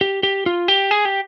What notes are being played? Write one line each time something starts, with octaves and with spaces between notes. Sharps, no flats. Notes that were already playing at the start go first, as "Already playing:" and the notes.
G4
G4
F4
G4
G#4
G4